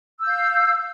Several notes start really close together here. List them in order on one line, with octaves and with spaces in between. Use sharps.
E6 G6 F5